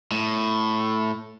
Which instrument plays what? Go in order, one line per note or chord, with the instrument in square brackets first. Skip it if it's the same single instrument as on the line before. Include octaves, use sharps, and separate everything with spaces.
[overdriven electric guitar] A2